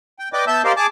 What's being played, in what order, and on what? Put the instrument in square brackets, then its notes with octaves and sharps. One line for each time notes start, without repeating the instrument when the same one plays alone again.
[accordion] G5
B4 D5 D#5 G5 D6
B3 E5 A5 E6 G6
G4 A#4 C5 D5 D#5 F5
G#4 G#5 A5 D6